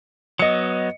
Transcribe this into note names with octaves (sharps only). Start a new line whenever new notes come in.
F#3 B3 D#5 C#7